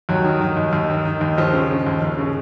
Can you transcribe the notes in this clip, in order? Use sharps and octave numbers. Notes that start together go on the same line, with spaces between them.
D#2 F#3
D#3
D#3
D#2
D#2
D#3
D#3
D#2
D#2 F3
C#3
C#3
D#2
D#2
C#3